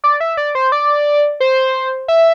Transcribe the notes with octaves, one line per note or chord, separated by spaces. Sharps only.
D5
E5
D5
C5
D5
C5
E5